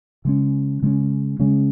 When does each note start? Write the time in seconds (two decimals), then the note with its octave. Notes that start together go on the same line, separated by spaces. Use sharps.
0.25 C#3 G#3 C#4
0.82 C#3 G#3 C#4
1.39 C#3 G#3 C#4